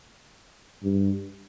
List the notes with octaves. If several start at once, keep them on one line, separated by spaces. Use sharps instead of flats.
G2